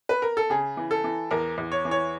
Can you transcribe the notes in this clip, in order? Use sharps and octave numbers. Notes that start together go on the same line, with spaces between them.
B4
A#4
A4
C#3 G#4
E3
A4
E3
E2 A#4
E2
C#5
E3
C#5